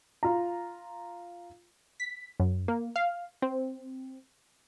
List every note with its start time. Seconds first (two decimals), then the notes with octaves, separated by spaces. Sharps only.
0.23 F4 A#5
2.00 B6
2.40 F#2
2.68 A#3
2.96 F5
3.42 C4